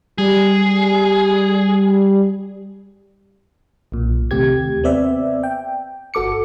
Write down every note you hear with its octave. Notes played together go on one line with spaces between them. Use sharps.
G3 G#4
B1 A#2
D#2 C3 A3 G4 G#6
B3 C4 D5 E5
G5
G1 F#4 A4 D6 C#7